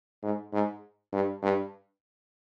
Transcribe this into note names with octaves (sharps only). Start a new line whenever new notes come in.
G#2
G#2
G2
G2